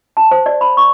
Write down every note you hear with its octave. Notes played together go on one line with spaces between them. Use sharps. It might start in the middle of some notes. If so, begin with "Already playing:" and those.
A5
C5
D5
B5
C#6